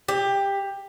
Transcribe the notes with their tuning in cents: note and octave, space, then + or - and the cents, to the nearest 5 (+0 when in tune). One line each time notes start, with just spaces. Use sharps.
G4 +15